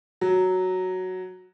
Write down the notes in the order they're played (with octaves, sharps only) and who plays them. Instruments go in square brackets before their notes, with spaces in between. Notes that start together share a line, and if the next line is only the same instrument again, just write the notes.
[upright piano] F#3